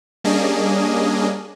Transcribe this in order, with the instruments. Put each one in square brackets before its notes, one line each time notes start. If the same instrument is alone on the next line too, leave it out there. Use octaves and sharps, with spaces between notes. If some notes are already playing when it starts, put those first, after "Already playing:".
[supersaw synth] G3 A#3 C#4 D4 G#4 D#5